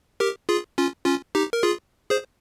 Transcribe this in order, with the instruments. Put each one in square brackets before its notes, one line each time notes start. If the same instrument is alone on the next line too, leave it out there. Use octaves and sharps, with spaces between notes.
[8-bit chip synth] G4 A#4
F4 G#4
C#4 F4
C#4 F4
D#4 G4
A#4
F4 G#4
G#4 C5